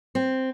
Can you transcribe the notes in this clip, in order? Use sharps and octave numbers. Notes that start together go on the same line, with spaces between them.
C4